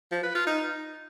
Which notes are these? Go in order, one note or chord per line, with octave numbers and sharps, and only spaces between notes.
F3
B4
F4
D#4